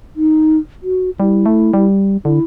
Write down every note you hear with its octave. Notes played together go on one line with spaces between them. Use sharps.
D#4
F#4
G3 E4
A3
G3
D3 E4